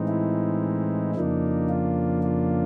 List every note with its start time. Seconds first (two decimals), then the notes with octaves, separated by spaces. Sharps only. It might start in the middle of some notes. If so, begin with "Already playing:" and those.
Already playing: A2 E3 G#3 C4 D#4
0.08 E4
1.15 F2 C#3 F3 A#3 D4 D#4
1.69 F4
2.23 F4